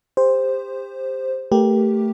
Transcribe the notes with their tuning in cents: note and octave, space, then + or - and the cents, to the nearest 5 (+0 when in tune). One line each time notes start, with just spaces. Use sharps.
G4 +30 C5 +0
A3 +10 G4 +0 A#4 +25